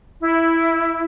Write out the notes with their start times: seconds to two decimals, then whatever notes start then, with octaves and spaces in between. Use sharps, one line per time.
0.20 E4